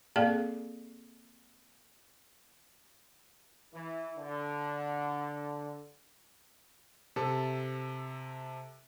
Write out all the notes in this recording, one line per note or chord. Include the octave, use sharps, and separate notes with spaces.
A#3 C4 G#4 A4 D5 F5
E3
D3
C3 A4